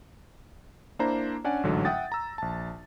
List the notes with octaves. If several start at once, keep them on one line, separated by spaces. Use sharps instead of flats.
A#3 D4 E4 C5 A#5
C#4 D4 D5 F#5 G#5
A1 G#2 D3 F#3
E5 F#5 G5 D#6 A6
A#5 E6
A#1 A5